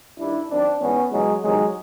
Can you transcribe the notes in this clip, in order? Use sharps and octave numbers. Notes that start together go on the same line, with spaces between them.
G2 D#3 D4 E4
F#2 D#3 C4 D4
G#2 E3 B3 C#4
E2 C#3 E3 F#3 G#3
E2 C3 D#3 F#3 G#3